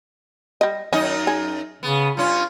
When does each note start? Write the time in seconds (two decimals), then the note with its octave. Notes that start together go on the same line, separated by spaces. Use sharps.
0.61 G3 D#5
0.93 F#2 D#3 C#4 D#4 D#5
1.27 G#4
1.83 C#3 B3
2.17 G2 C#4 F4